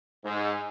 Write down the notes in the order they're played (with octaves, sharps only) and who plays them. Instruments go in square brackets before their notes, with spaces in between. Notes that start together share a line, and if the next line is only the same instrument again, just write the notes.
[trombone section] G#2